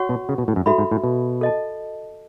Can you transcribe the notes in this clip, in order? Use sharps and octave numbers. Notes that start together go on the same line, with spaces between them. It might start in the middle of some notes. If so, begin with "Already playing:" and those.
Already playing: F#4 C#5 F#5 C#6
B2
C#3
B2
A2
F#2
G#2 F#4 A4 E5 B5
G#2
A2
B2
A4 D#5 A5